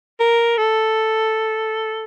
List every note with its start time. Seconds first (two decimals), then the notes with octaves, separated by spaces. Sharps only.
0.20 A#4
0.57 A4